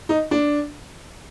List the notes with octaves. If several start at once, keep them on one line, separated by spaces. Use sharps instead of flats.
D#4
D4